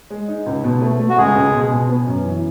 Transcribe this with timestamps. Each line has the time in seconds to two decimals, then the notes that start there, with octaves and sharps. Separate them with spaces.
0.10 G#3
0.28 D#4
0.46 C#2
0.64 B2
0.82 A3
1.00 A3
1.09 F#4
1.18 C#2 G#3 G#4
1.35 C#2
1.53 B2
1.71 B2
1.89 B3
2.07 F#2
2.24 E3